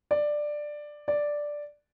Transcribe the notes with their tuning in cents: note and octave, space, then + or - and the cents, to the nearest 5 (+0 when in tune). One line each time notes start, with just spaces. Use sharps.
D5 +10
D5 +0